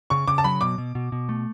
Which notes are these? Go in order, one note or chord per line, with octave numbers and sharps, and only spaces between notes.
C#3 C#6
C#3 D6
A5
F#3 B5
B2 D6
B2
B2
B2
A3